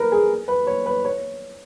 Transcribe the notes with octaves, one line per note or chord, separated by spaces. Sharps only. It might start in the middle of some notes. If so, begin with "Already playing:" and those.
Already playing: A#4 B4
G#4
B4
C#5
B4
C#5